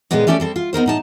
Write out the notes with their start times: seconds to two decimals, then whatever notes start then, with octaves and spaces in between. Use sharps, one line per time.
0.11 A#2 D3 G3 G#3 B3 D#4
0.27 A3 C#4 G4 A4 C#5 D5
0.40 G3 C4 A4
0.56 F4
0.73 B3 D#4 A#4 C5
0.86 A2 D#4 A5